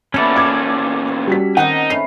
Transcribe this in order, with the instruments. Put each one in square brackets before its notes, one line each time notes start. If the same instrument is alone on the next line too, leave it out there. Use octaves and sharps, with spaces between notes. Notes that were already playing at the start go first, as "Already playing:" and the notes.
[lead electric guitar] E2 A#2 [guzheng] B3 E4 [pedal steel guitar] C#4 A4 D5
[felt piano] D6 G#6
G3 F#4 B6
[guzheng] D#3 A#3 C4 [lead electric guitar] D#4 [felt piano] F#5
[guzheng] A3 C#4 B4 [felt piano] C7